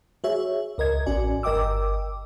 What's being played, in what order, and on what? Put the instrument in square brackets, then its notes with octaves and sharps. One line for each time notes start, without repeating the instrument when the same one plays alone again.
[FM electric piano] F#4 G#4 C#5 E5
C#2 A#4 D#5 G#6
A1 C#4 F#4 D5 G#5
G1 A#4 D#5 G5 D6 E6